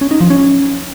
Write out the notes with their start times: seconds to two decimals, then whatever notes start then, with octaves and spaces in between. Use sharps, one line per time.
0.01 C#4
0.11 D#4
0.21 F3
0.30 C#4